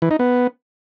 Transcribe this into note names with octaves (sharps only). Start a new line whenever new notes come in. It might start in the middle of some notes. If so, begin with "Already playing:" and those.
E3
D#4
B3